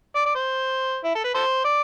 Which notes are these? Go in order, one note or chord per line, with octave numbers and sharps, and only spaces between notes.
D5
D5
C5
E4
A4
B4
A4 C5
D5